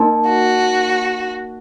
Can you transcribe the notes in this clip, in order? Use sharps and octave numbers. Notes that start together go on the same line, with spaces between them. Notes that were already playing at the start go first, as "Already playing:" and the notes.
Already playing: A#3 D#4 A#4 D#5 A5
F#4